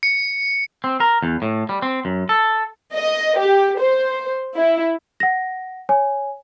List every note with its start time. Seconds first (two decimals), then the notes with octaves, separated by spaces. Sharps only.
0.03 C#7
0.84 C4
1.00 A#4
1.23 E2
1.42 A2
1.69 G3
1.82 C4
2.05 F#2
2.29 A4
2.94 D#5
3.40 G4
3.80 C5
4.57 E4
5.20 F#5 A#6
5.89 C#5 G#5